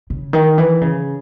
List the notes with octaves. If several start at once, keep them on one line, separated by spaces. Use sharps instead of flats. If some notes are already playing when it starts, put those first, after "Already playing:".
C#3
D#3
E3
C#3